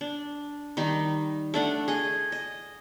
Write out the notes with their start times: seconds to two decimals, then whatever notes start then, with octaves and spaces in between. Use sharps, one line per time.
0.01 D4
0.77 D#3 G3 D#4
1.54 A3 D4 F#5
1.88 G#4 D#5
2.32 D#5